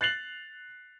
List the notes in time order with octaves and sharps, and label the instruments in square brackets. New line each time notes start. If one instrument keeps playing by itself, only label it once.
[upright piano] F#6 A6 C7 F7 F#7